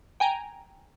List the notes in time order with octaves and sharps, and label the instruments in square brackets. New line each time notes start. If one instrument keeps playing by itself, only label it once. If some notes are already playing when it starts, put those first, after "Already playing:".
[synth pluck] G5 G#5 A#5